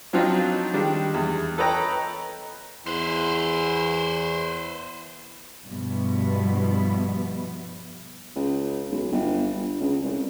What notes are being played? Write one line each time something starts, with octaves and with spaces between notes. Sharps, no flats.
F3 F#3 C4 D4 D#4 F4
D#3 G3 G#3 D4
E2
A4 B4 C#5 D#5 G5 A#5
E2 E4 B4 C5
G2 B2 F3 B3 E4
C#2
B1
G1
G1
C#2
C2